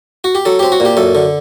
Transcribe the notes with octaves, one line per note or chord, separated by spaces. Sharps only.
F#4
G4
F#3 A4
C4 G4
F#4
A#2
G4
F#2 A4
D3